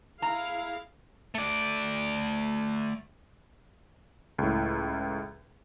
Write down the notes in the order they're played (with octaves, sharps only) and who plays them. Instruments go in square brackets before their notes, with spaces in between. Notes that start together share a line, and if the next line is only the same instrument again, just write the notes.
[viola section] E4 G#4 F5 [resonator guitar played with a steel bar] A#5
[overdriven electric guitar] A3 D5
[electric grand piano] C#2 A2